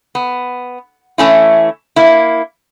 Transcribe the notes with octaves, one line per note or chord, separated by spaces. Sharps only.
B3
E3 A3 C#4 E4
A#3 E4